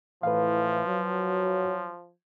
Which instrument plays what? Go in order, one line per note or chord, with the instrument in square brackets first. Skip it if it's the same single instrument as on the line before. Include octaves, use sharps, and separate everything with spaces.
[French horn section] A2 E3 [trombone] F3 [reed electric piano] B4 F5
[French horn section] F#3